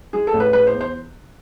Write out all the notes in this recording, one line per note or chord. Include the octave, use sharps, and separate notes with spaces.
G#3 G#4
A4
A1
B4
G#3 B4
C5
E2
C5